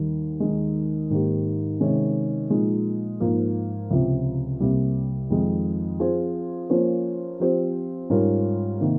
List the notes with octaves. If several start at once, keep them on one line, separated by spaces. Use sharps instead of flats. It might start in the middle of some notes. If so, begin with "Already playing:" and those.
Already playing: D#2 D#3 G3
D#2 D#3 G#3
G#2 D#3 A#3 D#4 G4
C3 D#3 G#3 C#4
A#2 F3 G#3 D#4
G#2 F3 A#3
C#2 C3 F3
C2 C3 G3 A#3
F2 D#3 G#3
F3 C4 F4 G#4 C5
F3 A#3 C#4 F4 C5
F3 C4 G4 C5
G#2 G3 C#4 F4 A#4
C3 D#3 A#3 D#4